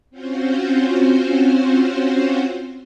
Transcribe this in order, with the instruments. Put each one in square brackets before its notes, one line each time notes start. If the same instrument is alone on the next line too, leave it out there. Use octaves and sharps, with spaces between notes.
[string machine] C4 C#4 F4 F#4 C5